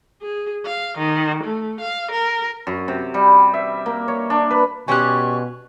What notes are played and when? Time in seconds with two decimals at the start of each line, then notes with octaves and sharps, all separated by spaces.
0.22 G#4
0.66 F5
0.99 D#3
1.44 A3
1.81 F5
2.12 A#4
2.67 F#2
2.88 C3
3.14 G3
3.54 E5
3.86 A#3
4.08 C#5
4.30 D4
4.50 B4
4.88 B2 G3 C#4 G4 G#5 C6 C#6 F#6